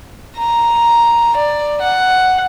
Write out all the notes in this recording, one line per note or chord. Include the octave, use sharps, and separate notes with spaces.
A#5
D5
F#5